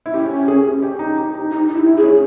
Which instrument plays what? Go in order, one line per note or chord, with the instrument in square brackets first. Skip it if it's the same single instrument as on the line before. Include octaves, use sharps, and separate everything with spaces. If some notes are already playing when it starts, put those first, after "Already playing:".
[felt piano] E4
[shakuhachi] C#4 [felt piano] G4
[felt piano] G#4
G4
D#4
G4
D#4
[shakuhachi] D#4 [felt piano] G4
[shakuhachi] D#4 [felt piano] G4
[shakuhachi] E4
[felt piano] E4
[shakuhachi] G#4
[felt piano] C#4